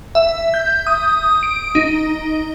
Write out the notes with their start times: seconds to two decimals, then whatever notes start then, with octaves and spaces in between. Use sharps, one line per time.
0.15 E5
0.54 G6
0.87 D#6
1.43 D7
1.75 D#4